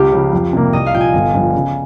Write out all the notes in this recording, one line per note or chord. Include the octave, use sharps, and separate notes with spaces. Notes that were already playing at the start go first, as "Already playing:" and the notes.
Already playing: C#2 F4 G4
C#3 F3
F2
C3 G3 A#3
C2 D#5
F5
A#2 F3 G5
G#5
G1
G2 F3
C#3